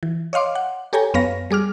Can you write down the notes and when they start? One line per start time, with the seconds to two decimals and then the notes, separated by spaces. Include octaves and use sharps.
0.03 E3
0.33 C#5 D#5 F5 C6 D6
0.55 F#5
0.93 G4 A4 C#5 G5 G#5 A#5
1.14 F#2 B3 B4 C#5 F5 A#6
1.51 G3 G#4 D6 F6